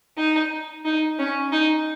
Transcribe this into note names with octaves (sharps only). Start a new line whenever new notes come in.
D#4
D#4
C#4
D#4